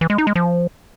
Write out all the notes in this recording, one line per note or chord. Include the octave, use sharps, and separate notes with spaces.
E3
G#3
D#4
G#3
F3